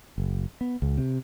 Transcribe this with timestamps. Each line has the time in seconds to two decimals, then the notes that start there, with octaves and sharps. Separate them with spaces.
0.18 F#1
0.61 B3
0.82 C#2
0.98 C3